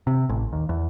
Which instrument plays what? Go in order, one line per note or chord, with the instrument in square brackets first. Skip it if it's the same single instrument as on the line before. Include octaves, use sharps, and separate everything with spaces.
[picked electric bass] C3
A1
D#2
E2